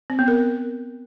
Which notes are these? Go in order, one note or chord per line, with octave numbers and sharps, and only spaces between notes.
C4
B3
A#4